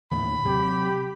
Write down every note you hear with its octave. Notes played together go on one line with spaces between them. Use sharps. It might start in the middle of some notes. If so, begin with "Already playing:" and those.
D#2 A2 D3 B5
C3 F#3 G4